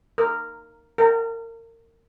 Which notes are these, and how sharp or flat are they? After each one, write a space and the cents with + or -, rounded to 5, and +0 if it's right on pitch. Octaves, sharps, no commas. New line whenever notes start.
A#4 -10
A#4 -30